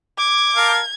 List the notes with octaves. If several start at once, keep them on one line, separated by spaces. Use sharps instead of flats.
D6 G#6
A#4 F5 A5